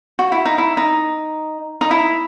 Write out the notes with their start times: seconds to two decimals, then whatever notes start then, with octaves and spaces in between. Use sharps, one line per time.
0.19 F#4
0.32 E4
0.45 D#4
0.58 E4
0.77 D#4
1.81 D#4
1.91 E4